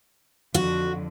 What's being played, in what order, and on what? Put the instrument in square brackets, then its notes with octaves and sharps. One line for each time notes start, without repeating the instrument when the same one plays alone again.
[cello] F2 D3 [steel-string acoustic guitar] F#4